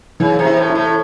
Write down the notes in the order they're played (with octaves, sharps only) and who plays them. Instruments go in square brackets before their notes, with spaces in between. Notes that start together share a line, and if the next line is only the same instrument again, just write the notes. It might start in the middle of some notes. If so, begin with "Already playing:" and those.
[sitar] C#3 [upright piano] E3
[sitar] C3
[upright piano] E4
[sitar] A2
[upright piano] E4
[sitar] A2